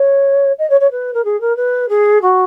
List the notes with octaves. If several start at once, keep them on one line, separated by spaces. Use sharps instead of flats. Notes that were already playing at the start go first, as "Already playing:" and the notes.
Already playing: C#5
D#5
C#5
C#5
B4
A#4
G#4
A#4
B4
G#4
F#4